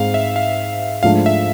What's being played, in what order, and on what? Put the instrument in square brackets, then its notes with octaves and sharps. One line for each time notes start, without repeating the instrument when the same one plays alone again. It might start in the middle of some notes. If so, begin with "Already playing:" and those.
Already playing: [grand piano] G#2 G#3 C4 [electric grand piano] F5
[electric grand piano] E5
F5
[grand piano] G#2 F3 A3 D4 [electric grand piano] F5
[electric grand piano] E5